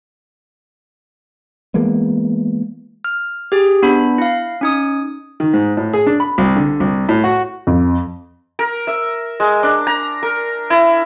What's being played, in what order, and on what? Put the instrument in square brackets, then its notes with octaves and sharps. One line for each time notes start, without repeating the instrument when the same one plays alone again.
[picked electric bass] E3 G#3 A#3 B3
[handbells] F6
G4 G#4
B3 D4 B5
E4 F5
C#4 D#4 D#6
[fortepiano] D#3
G#2
A2
G#4
D4
B5
C2
D3
C2
A2
F#4
[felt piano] F2
[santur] A#4
E5
G#3
D4
A#5
A#4
E4